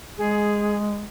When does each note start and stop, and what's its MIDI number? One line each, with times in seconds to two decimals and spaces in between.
0.18 1.04 56
0.18 0.76 68